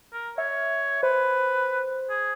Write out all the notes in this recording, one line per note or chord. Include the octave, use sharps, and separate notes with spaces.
A#4
C#5 E5
B4 C5
G#4